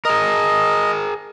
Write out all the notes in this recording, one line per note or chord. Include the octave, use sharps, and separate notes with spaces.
G#4 A#4 D#5